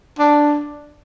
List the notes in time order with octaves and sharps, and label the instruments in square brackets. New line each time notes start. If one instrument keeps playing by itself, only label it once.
[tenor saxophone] D4